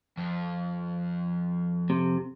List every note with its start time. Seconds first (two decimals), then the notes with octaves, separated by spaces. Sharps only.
0.18 F2
1.90 C3